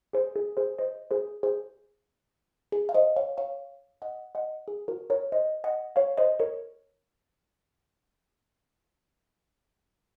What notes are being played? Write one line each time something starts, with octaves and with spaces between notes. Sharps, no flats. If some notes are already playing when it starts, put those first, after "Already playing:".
G#4 C5
G#4
G#4 C5
C5 D#5
G#4 C5
G#4 C5
G#4
F5
C5 D#5
C#5 F5
C#5 F5
D#5 F#5
D#5 F#5
G#4
F#4 A#4
A#4 C#5
C5 D#5
D#5 F#5
C#5 F5
C5 D#5
A#4 C#5